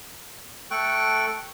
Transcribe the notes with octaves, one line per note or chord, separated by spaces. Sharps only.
A3 A4 G5 C#6 F#6